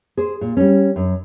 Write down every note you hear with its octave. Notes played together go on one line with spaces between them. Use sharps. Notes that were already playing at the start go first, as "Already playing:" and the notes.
G#4 C5
A#2
G3 C#4
F#2